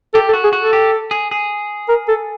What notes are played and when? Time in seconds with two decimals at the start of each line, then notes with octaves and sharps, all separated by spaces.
0.14 G4 A4
0.29 A4
0.33 F#4
0.44 G#4
0.53 F#4
0.58 A4
0.73 G4
1.11 G#4
1.31 G#4
1.89 A#4
2.08 A4